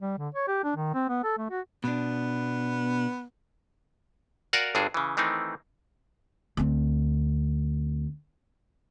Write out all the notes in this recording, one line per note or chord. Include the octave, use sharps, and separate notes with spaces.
G3
D3
C#5
G4
D4
D#3
C4
B3
A4
A3
F#4
B2 B3 D4
F#4 A#4 D5 F5 F#5 G#5
G1 G2 D4 F#4 G#4
C#3 E3
D#3 E3 A3 C4 D#4
D2 C4